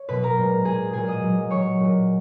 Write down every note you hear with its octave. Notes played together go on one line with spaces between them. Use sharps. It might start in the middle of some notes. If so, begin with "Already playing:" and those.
Already playing: C#5
B2 F#3 B4 B5
A#4 A#5
A#2 G#3
A#2 G#3 G#4 G#5
A#2 F#3 G#4 G#5
D#5 D#6
A#2 F#3
A#2 F#3 C#5 C#6
A#2 F#3